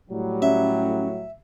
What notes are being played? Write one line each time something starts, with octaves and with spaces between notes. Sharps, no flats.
A2 F#3 G3
C#4 E5